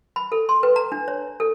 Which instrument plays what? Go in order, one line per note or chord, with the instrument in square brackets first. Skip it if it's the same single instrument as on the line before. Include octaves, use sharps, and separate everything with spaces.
[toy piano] B5
A4
C6
B4
A#5
D4
C#5
A4